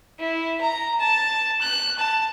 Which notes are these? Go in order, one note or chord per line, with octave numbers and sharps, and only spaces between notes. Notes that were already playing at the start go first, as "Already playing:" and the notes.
E4
A#5
A5
F#6
A5